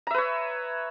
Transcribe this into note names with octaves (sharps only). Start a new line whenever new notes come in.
B4 C#5 E5 A#5